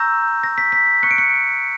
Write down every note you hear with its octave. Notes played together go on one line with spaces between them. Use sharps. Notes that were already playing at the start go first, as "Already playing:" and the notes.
Already playing: A#5 C#6 E6 G6 A#6
A#6
B6
B6
C#6 F#6 C#7
D7
C#7